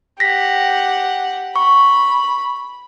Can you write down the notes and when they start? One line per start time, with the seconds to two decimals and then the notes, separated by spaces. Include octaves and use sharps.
0.20 G4 F#5 A#6 B6
1.56 B5 C#6